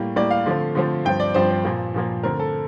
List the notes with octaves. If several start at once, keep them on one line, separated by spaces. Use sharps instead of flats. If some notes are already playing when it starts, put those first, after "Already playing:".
Already playing: A2 G3 A#3
A2 G3 A#3 D5
F5
D3 F3 A3 C4
D3 F3 A3 C4
G2 F3 C4 G5
D5
G2 F3 C4 C5
C5
A#2 F3 A#3
A#2 F3 A#3
D3 A3 C4 A#4
A4